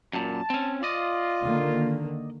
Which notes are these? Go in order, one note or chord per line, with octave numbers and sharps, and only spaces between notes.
F#2 A#2 A5
C4 C#4
F4 D5 D#5
D3 D#3 A#3